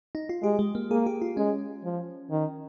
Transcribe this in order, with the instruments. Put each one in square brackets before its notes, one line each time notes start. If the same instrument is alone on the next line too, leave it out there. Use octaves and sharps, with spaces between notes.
[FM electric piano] D#4
F4
[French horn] G#3 [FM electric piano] G4
[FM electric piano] G#3
A#3
[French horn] A#3 [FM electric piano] G#4
[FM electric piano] G4
F4
[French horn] G#3 [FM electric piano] C#4
[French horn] F3
D#3